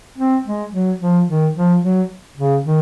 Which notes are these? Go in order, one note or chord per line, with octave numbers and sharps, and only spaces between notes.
C4
G#3
F#3
F3
D#3
F3
F#3
C#3
D#3